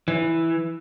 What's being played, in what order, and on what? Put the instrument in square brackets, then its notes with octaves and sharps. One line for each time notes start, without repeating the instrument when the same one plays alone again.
[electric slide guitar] E3